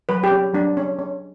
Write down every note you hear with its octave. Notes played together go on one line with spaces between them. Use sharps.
F#3 B4
G4
C#4
F#3 D4
C#4
C#4